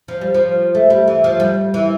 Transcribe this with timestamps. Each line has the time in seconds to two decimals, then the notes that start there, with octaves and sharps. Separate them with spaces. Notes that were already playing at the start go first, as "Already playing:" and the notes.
0.08 F3
0.21 G3
0.34 F3
0.75 A3
0.90 G3
1.08 E3
1.24 F3
1.40 G3
1.74 E3